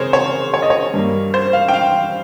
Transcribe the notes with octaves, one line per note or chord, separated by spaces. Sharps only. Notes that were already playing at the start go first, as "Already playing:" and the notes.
Already playing: C#3 C4 G#4 A#4 C5 C#5
C#5
C#5
D#5
C#5
G2 G3 A#3
C5
F5
G5
F5